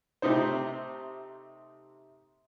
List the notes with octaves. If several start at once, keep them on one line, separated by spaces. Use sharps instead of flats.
C3 A3 D#4 C5